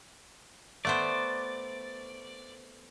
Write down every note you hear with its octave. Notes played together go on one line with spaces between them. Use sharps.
A3 B3 C5 D5